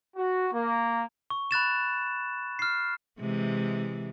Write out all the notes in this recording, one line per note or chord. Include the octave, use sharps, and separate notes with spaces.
F#4
A#3
C#6
B5 F#6 A6 E7
F6 C7
C3 E3 G#3